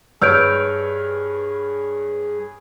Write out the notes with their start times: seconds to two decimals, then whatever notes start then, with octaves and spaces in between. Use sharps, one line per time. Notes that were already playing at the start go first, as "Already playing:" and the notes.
0.22 G2 G#4 B4 C#5 E6 F6 G6 D7